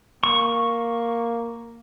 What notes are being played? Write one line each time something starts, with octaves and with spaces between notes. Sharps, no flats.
A#3 C#6